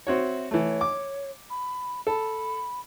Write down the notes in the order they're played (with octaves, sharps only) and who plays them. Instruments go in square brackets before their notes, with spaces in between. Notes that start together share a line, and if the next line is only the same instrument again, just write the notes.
[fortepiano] C4 F#4 C#5 [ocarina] E5
[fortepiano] E3 A3 [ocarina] C#5
[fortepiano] D6
[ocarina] B5
[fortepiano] A4 [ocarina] B5